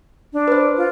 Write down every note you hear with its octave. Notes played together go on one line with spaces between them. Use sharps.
D4
B4 C5
F4